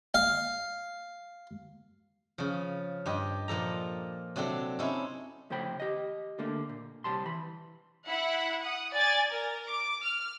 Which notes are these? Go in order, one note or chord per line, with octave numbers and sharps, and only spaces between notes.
F5
C#3 F3
G2 G4 D#5
A#2 F3 A4 A#5
C3 F#3 C4 D4 A4
C3 C#4 D#4 E4 A4
F2 A2 C#3 C5 G5 B5
G4 D#5
D3 A3 A#3
A#2
C2 G3 A5 C6
E3 B5
E4 F#5 B5
F#5 D#6
D5 G#5 A6
A#4
D6
F6